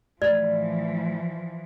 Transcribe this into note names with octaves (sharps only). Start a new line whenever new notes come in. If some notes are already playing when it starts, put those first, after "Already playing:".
A2 E3 F3 D5